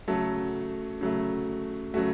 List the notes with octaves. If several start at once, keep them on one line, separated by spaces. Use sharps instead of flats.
C#3 F#3 A3 A4
C#3 F#3 A3
C#3 F#3 A3 F#4